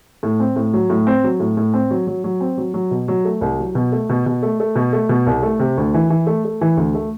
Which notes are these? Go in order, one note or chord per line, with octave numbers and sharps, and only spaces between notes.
A2
C4
A2
F#3
A2
C4
F#3
A2
A2
C4
F#3
F#3
F#3
C4
F#3
F#3
B2
F#3
A3
C2
F#3
B2
A3
B2
B2
A3
A3
B2
A3
B2
C2
A3
C3
D2
E3
E3
A3
A3
E3
D2
A3